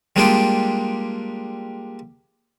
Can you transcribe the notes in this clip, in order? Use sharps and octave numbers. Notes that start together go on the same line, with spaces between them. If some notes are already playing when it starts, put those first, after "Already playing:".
G3 G#3 A#3 D4 F4 G5